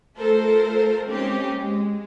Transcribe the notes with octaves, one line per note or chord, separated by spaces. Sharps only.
A3 F4 A4 A#4 C5
G#3 A#3 C4 C#4 D#4 G4
G#3